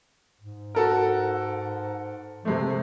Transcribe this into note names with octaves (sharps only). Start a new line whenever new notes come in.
G#2
F#4 A4 A#4
C3 F3 G#3 A3